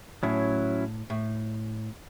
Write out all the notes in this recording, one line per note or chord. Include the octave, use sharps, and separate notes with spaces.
A2 F#3 C#4 E4
A2